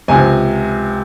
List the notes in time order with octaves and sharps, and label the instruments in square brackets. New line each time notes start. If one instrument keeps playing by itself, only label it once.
[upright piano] C#2 C3 F3 G#5